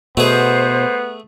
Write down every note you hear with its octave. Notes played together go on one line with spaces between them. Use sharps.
B2 A3 B3 G#4 C5